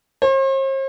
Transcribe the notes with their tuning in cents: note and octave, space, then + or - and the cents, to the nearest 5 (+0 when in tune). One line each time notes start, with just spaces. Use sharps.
C5 +45